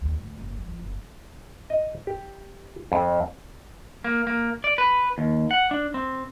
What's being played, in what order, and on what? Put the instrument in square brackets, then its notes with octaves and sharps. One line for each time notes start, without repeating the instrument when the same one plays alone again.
[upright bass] D#2
D2
F#1
F3
F3
F#1
[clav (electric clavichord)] D#5
G4
F2
[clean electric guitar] A#3
A#3
D5
B4
D#2
F#5
D4
C4